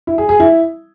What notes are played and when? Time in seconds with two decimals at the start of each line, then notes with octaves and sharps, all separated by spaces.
0.07 E4
0.18 G#4
0.29 G#4
0.40 E4